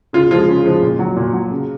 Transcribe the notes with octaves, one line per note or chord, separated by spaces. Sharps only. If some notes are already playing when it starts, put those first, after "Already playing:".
C#3 F4
F3 G#3 F4
C#3
F3 G#3
A#2
F#3
A#2
F#3
C#3